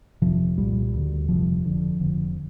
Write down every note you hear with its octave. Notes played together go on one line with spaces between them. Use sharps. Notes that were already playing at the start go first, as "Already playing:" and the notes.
G1 F2 C3 F3
C2 A#2 G3
D2 D3
F1 F2 C3 F3
G1 F2 D3
F1 F2 D3